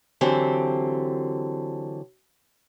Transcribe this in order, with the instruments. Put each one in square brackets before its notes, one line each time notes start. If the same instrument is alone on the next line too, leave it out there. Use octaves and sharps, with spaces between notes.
[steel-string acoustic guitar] D3 E3 F#3 C4 G4